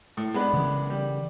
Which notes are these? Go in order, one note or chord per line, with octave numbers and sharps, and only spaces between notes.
A2
G#3 B3 D4
C#3 E3
G3